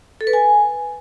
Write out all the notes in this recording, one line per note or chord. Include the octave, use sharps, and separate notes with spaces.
A4
B4
G#5